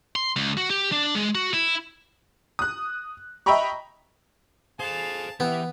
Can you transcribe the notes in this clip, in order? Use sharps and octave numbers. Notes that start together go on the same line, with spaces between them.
C6
C#2
F#4
G4
D4
G#3
F#4
E4
D#6 F#6
D#5 E5 G5 A#5 B5 C#6
G#4 A4 C5 F5 A5
E3 B3 G4 B4 E5